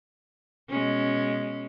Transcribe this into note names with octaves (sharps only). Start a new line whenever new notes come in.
B2 G#3 C#4